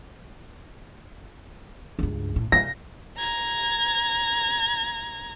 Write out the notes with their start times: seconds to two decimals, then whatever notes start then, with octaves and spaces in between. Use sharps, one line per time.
1.99 C#2 G2
2.36 A2
2.52 C3 A#6
3.18 A#5 G#6